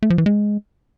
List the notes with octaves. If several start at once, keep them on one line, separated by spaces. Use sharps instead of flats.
A3
F3
E3
G#3